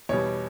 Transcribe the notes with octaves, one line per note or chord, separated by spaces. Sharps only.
E2 B2 G3 C#5